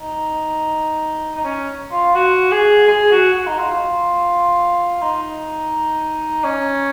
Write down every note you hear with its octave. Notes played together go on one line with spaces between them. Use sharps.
D#4
D#4
C#4
F4
F#4
G#4
G#4
F#4
F#4
D#4
F4
D#4
C#4